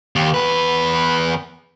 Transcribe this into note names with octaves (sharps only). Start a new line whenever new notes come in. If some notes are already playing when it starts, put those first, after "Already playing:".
D#2
E2 B4